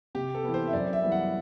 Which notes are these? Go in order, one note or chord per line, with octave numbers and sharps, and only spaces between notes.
C3 G4
A4
E3 B3
C5
E5
F#2 D5
E5
E3 G3 B3
F#5